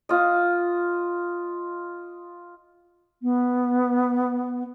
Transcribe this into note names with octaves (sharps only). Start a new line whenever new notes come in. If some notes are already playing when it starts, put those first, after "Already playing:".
F4 D#5
B3